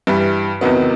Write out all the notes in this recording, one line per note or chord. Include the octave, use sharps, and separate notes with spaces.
G2 E3 G3
E2 C3 D#3 F#3 B3